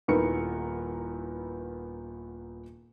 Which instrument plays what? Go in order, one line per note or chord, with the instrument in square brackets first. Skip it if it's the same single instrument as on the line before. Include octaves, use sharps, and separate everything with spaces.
[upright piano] D#1 D#3 B3 E4 A#4 C#7